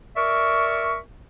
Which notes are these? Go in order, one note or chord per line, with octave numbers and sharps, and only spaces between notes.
A#4 D5 E5 C#6